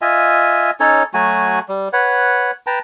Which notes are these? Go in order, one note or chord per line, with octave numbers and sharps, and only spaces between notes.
F4 D#5 E5 G#5
C#4 D#4 A4 C#5
F#3 A3 F#4 G#5
G3
B4 C#5 F#5
B4 G5 A5 A#5